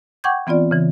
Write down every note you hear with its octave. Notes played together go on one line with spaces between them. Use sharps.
F#5 G5 C#6 D6 G6 G#6
E3 B3 C4 F4 D5
C#3 E3